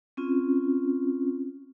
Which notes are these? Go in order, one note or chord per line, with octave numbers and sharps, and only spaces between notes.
C4 C#4 F4